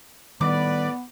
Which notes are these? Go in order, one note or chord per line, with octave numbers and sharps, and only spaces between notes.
A2 D#3 G3 B3 B4 D5 D6